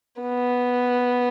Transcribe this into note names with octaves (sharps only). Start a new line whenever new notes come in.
B3